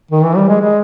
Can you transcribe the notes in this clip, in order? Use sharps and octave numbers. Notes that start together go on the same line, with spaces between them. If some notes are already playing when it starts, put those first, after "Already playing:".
D#3
E3
G3
G#3
G#3